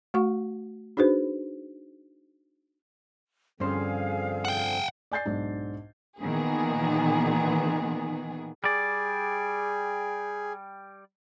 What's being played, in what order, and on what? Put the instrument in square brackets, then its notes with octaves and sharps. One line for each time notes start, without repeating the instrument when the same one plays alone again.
[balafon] A3 F#4 F#5 C#6
D4 D#4 F#4 G#4 B4 C5
[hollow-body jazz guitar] G2 C#4 C5 [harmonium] D3 F3 C4 [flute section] G#4 F5
[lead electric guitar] F#5 G5
[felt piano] D5 G#5 G6 A6 C7
B1 G#2 D4
[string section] A#2 D#3 E3 B3 G#4
[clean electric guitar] G3 D5 [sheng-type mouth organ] G#4